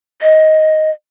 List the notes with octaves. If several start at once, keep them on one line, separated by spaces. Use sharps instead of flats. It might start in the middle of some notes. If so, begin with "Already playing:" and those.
D#5